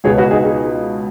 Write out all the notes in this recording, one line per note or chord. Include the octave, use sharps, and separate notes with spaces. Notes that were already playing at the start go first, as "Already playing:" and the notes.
C#2 B2 G#4 C#5
F#4 B4
D#4 G#4
D#4 G#4